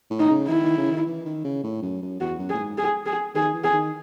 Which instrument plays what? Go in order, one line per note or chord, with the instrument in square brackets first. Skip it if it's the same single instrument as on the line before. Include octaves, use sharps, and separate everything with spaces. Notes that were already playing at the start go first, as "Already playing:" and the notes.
[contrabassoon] A2
[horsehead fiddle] D#4
[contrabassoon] C#3
[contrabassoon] D#3 [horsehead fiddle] E4
[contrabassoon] D#3
C#3
D#3
E3
D#3
C#3
A2
F#2
F#2
[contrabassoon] E2 [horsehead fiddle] F#4
[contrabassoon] F#2
[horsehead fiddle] G#4
[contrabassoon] A2
G#2
[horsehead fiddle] G#4
G#4
[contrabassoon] D#3 [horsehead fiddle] G#4
[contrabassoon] E3
[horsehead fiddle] G#4
[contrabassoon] D#3